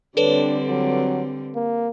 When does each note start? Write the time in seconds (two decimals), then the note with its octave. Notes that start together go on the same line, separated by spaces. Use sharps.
0.17 D3 G3 C4 D4 A4 B4 C#5
0.70 F#3
1.55 A#3